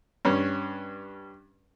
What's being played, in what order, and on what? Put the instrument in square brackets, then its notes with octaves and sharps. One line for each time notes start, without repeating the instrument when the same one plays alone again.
[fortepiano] G2 C#4